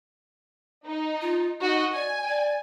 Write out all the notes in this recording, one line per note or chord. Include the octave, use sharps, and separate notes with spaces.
D#4
F4
D#4 F#4 D#5
D5 G#5
D5